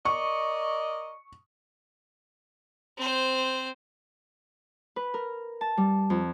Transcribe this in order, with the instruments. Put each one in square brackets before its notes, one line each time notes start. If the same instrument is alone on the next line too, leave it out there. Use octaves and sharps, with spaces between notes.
[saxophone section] A#4 D5 D#5 [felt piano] C#6
[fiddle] C4 C5
[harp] B4
A#4
A5
G3
F2